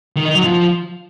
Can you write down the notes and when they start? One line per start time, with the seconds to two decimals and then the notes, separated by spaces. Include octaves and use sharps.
0.16 D#3
0.25 D#4
0.35 F#3
0.44 F3